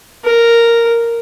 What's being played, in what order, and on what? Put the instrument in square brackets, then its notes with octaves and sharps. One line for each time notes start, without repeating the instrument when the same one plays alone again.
[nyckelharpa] A#4